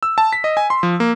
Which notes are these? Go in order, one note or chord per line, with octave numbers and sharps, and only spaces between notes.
E6
A5
B6
D#5
G#5
C6
F3
A#3